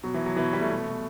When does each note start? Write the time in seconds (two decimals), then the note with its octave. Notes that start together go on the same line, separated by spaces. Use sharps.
0.03 B2 F#3
0.14 E3
0.20 B2
0.26 F#3
0.36 B2 E3
0.53 B2 G3
0.61 A3
0.69 B2
0.86 B2